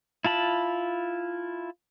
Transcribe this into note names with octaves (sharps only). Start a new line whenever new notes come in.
E4 F4 A5 B5